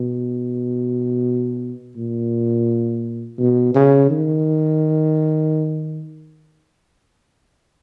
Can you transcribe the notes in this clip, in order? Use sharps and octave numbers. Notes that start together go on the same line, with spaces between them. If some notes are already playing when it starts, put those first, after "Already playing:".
Already playing: B2
A#2
B2
C#3
D#3